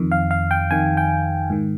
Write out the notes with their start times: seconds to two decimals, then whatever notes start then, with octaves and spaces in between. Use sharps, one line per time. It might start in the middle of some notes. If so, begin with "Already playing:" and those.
Already playing: F2 D#3
0.12 F5
0.31 F5
0.51 G5
0.71 F2 D#3 G#5
0.97 G5
1.50 G#2 D#3